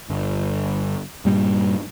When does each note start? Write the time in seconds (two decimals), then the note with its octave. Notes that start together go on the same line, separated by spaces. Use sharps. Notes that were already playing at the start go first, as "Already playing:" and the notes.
0.10 G1
1.25 G2 A#2 G3